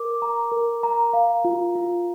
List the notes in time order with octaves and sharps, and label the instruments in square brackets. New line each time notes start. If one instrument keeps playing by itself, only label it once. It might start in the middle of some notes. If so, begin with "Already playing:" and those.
Already playing: [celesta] A#4 D6
A#5
A#4
A#5
F5
F4
F4